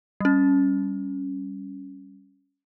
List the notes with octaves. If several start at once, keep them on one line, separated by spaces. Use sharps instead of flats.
G3 C#4